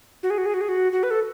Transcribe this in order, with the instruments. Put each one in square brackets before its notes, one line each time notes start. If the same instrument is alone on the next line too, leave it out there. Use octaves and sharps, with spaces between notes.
[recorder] F#4
G#4
F#4
G#4
F#4
G#4
F#4
F#4
B4
A4